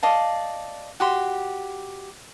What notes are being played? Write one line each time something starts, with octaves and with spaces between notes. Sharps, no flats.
D5 D#5 F5 A5
F#4 G4 C6